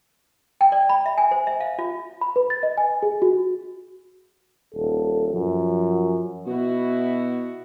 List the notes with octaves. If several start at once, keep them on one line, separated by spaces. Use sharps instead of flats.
G5
D5
B5
E5
G#5
C5
E5
F5
F4
B5
B4
A6
D#5
G#5
G#4
F#4
D#1 A4
F#2 F3
B2 E4 F#4